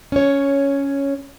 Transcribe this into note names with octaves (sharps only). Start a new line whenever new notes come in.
C#4 C#5